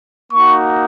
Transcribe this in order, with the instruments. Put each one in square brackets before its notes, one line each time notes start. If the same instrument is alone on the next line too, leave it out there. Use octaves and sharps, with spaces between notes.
[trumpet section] A#3 D#4 F#4 C#6